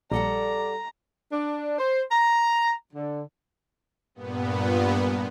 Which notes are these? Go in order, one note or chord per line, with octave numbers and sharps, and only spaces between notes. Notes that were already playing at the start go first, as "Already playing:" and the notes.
A#1 G3 A4 D5 F#5 A#5
D4
C5
A#5
D3
G2 A#2 B3